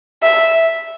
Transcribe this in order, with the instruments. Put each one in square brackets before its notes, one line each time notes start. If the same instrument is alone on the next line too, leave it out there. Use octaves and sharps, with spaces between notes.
[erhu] E5